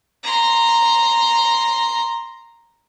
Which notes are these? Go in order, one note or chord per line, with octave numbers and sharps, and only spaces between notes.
A#5 C6